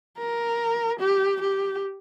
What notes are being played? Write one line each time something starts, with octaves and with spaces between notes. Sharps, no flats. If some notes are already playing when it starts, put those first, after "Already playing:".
A#4
G4
G4